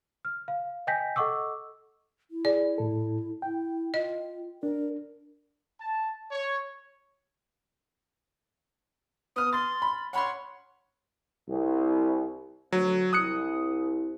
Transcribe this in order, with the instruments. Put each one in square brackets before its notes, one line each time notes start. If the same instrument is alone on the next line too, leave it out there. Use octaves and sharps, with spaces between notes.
[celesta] F6
F5
D#5 G5 G#5 G6 A#6 B6
A4 D#5 F#5 C#6 D6 E6
[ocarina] E4
[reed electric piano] G#4 [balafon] D5
[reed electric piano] A2 A4
[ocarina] E4 [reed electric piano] G5
[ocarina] F4 [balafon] D#5
[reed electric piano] D4 [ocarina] A#4
[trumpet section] A5
C#5
[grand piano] B3 F6 [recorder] D#6
[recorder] C6 [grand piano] A6
[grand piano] B5
[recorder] C#5 [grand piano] F#5 B5 C6
[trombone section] C2
[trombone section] D2 [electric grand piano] F#3
[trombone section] C2 [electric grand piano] D#6 F#6 C#7